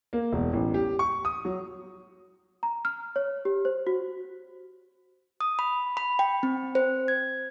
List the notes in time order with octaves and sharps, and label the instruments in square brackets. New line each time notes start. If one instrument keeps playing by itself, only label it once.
[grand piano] A#3
E1
A1
G4
C#6
D#6
F#3
[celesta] A#5
F6
C#5
G4
C5
F#4
[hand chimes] D#6
B5
B5
G5
C4
C5
G#6